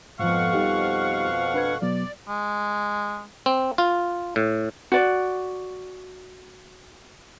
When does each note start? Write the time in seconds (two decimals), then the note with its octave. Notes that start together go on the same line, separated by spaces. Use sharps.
0.19 F2 G#2 B2 F3 F5 F#5 C#6
0.53 G3 D#4 G4
1.54 D4 B4 G#6
1.82 B2 F#3 B3 D5
2.29 G#3
3.46 C4
3.78 F4
4.36 A2
4.92 F#4 D5